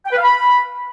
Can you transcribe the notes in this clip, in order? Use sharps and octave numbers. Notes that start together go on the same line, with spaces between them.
G5
B4
F5
B5